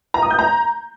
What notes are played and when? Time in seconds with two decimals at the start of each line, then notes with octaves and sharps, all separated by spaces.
0.14 A#5
0.22 D#6
0.30 G6
0.39 A#5